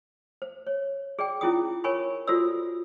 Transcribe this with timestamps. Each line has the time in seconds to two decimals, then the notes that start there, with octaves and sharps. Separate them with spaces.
0.42 C5
0.67 C#5
1.19 G#4 D5 G5
1.41 C#4 E4 F4 G#4 G5 D#6
1.84 A#4 C#5 G#5 B5 C#6
2.27 F4 F#4 A4 C5 D5 E6